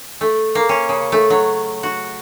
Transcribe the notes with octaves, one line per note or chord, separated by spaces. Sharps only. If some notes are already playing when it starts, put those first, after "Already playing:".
A3
A#3
C#4
C#3
A3
F#3
F#4